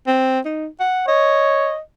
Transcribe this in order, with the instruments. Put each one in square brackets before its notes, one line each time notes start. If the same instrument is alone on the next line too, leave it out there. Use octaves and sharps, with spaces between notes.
[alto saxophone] C4
D#4
F#5
[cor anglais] C#5 [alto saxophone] D#5